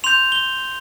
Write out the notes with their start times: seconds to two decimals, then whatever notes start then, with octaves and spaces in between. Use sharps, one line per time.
0.04 C6 G6 F7
0.32 G7